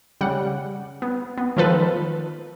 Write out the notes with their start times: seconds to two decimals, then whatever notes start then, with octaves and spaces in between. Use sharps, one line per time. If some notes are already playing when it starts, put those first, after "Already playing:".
0.21 C#3 G3 F#5
1.02 B3
1.38 B3
1.57 D#3 F3 A4 B4